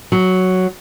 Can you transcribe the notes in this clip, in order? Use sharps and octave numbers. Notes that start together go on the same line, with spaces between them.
F#3